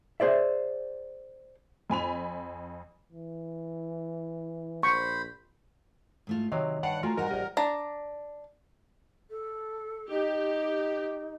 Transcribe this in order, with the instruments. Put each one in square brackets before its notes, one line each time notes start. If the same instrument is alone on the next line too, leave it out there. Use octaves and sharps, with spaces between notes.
[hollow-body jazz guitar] G#4 C5 D5 E5
[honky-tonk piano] F2 G#5 B5 F7
[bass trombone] E3
[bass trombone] A#1 [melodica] C5 B5 [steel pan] C#6
[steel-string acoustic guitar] G#2 A3 F4
[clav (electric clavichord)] C3 F#3 F5 [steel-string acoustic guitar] D#3 [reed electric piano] C#5 D#5
[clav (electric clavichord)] G2 D5 F5 [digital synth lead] F#5
[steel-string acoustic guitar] A3 [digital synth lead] F4 [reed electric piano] F#4 G#5 A#5 [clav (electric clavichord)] A#4
[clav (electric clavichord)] G#2 [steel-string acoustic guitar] G3 F#5 [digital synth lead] A#4
[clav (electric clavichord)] A#1 D#5 [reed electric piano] G4
[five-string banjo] D4 A#5
[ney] A4
[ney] D#4 [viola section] G4